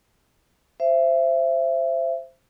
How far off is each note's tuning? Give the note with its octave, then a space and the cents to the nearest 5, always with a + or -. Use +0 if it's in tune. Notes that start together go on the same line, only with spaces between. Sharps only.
C5 +0 E5 +25